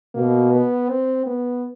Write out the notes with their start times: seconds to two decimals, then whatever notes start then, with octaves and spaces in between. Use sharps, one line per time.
0.15 B2 A#3
0.52 B3
0.89 C4
1.26 B3